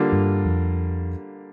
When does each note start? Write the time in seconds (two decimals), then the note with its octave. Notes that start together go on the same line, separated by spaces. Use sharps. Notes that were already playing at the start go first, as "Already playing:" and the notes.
Already playing: D3 G3 A#3 D4 F4
0.12 G2
0.45 F2